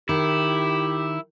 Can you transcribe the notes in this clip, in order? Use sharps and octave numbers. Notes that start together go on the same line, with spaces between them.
D#3 E4 G4